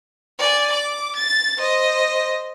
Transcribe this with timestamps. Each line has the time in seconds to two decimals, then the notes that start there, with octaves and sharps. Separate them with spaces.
0.39 D5 G#5
0.73 D6
1.16 A6
1.58 C5 D#5